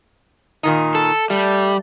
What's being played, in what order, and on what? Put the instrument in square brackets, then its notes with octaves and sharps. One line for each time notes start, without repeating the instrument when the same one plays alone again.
[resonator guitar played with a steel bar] A#2 D#3 D#4
[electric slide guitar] A4
[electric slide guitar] G3 [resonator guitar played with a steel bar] A3